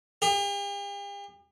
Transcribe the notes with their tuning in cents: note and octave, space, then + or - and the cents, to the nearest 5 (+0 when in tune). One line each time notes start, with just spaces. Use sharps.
G4 +45